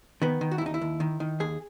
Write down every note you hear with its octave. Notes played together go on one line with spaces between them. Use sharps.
D#3 B3
D#3
F#4
E4
D#2 D#4
E4
D#2
D#3
D#3
D#2 G#4